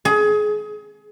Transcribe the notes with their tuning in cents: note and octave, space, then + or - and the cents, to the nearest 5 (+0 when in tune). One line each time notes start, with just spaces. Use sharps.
G#4 +25